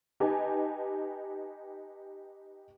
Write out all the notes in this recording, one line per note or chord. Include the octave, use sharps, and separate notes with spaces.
D#4 G4 B4 G#5 A5